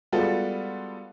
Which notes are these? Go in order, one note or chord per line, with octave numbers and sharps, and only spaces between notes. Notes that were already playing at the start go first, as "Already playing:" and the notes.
G3 G#3 B3 F4 F#4 A4